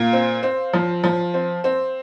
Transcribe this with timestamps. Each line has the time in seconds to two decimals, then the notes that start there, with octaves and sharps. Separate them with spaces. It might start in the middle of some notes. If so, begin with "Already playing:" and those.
Already playing: A#2 F5
0.13 C4
0.43 C4
0.73 F3
1.04 F3
1.34 C4
1.64 C4